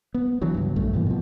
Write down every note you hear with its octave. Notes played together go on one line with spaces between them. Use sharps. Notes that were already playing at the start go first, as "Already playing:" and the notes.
B3
D3 E3 F#3
C#2 G2
A#1 F#2 A3
G2 B2 E3 A#3
B2 F3